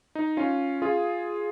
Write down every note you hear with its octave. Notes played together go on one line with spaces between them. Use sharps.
D#4
C#4 F4
F4 G#4